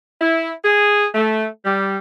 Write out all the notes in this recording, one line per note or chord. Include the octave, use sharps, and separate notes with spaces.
E4
G#4
A3
G3